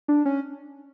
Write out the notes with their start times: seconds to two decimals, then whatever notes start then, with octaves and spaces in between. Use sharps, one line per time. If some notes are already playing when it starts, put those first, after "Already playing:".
0.08 D4
0.25 C#4